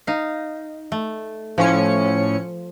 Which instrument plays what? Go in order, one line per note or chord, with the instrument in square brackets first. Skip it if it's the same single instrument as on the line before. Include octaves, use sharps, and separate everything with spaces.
[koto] D#4 F5
A3
[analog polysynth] A2 C#4 C#7 [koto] F3